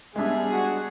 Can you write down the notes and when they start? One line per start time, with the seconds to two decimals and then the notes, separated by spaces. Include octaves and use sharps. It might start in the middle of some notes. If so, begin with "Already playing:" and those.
0.16 G3 G#3 B3 D4 G#4 E5
0.50 F#4